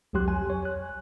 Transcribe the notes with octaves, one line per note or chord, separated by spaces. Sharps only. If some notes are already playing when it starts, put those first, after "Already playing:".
C2 F2 F#3 G4 C6 F#6
G#5
C#5
F#6